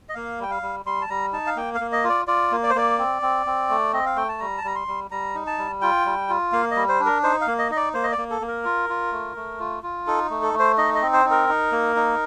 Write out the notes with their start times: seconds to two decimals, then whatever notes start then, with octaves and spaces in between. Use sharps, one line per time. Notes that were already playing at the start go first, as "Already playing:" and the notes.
0.09 D#5
0.15 A#3 F5
0.39 G3 G5
0.51 F5
0.62 G3
0.86 G3 C6
1.01 A5
1.09 G3 A#5
1.33 D#4 A5
1.47 F5
1.56 A#3 G5
1.75 F5
1.80 A#3
1.92 D#5
2.04 F4
2.09 D5
2.28 F4 D5
2.52 A#3
2.63 D5
2.70 C5
2.75 A#3 D5
2.98 C4
3.22 C4
3.46 C4
3.70 A3
3.93 C4 D#5
4.06 F5
4.16 A3 G5
4.29 A5
4.40 G3 A#5
4.58 A5
4.64 G3 A#5
4.75 C6
4.88 G3
5.11 G3 A#5
5.35 D#4
5.47 A5
5.58 G3
5.81 F4 G5
6.06 G3
6.29 F4
6.52 A#3 F5
6.71 G3 D#5
6.89 C5
7.00 D4
7.06 A#4
7.23 D#4 C5
7.41 F5
7.47 A#3
7.59 D#5
7.70 D#4 D#5
7.77 D5
7.94 A#3 C5
8.03 D#5
8.12 D5
8.18 A#3
8.30 A4
8.41 A#3
8.48 A#4
8.65 F4
8.89 F4
9.12 A3
9.36 A3
9.60 F4
9.83 F4
10.07 D#4 A4
10.30 A3
10.42 A4
10.54 A3
10.59 C5
10.78 D#4 D#5
10.95 D#5
11.02 C4
11.13 C5
11.25 D#4
11.31 A#4
11.49 D#4
11.72 A#3
11.96 D#4